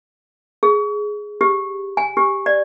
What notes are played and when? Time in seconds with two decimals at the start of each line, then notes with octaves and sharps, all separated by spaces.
0.63 G#4
1.41 G4
1.97 G#5
2.17 G4
2.46 D5